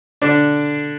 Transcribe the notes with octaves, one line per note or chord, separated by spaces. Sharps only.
D3 D4